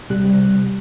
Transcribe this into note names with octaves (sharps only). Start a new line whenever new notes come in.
C3 G3 F#6